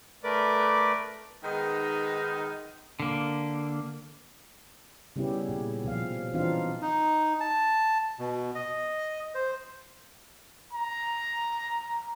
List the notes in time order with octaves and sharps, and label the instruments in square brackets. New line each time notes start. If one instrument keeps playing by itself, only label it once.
[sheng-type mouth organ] A3 A#4 B4 D5 D6
[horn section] D#3 G#3 B3 D#4
[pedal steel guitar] D3 A#3
[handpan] C#3 G3 B3 C#4 E4 G4
A#2
B2 F3 F5
E3 C4 D4 D#4 F4 F5
[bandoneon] D#4
A5
B2
D#5
C5
[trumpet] A#5